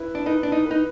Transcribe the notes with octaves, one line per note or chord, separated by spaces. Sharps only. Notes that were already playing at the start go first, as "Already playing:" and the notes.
Already playing: E4 B4
D4
D#4 B4
D4
D#4
B4
D#4